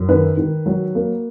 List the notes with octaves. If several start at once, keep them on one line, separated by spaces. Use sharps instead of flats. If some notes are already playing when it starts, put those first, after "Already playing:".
Already playing: F#2
D#3 B4
D#3
F#3
A#3